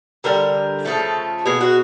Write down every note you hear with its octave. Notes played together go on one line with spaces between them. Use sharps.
D3 G3 A#4
C#3 F3 A3 A4
B2 G#3 G#4
F#4